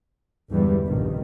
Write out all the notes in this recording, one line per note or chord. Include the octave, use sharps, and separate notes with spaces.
G1 E2 G2 E3 G3 G#3
F1 A#1 G2 D#3